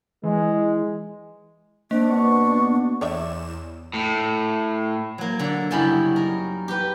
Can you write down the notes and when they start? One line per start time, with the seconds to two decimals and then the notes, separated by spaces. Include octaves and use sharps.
0.24 E3 G#3
1.91 A#3 C4 D4
2.09 B2 B3 C#6
3.01 E2 C#5 D5 E5 E7
3.93 A2
5.18 F#3 A#3
5.39 D3 D5
5.71 F#2 C#3 G3 E4 A5 B5
6.16 D#4 A#4
6.68 G4 B4